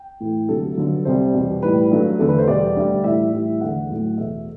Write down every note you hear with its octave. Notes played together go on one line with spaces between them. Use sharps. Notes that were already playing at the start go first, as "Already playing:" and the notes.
Already playing: G5
A2 E3 A3
D2 C3 F#3 A3 A4
G2 D3 F#3
C2 C3 G3 C5
E2 B2 G3
A2 E3 G3 B4
G2 F#3 A3
E2 D3 A3 A4
B4
C5
E2 B2 G3 D5
D2 D3 G3
A2 E3 G3 E5
A2 E3 G3
E2 D3 A3 F#5
A2 F#3 A3
E2 B2 A3 E5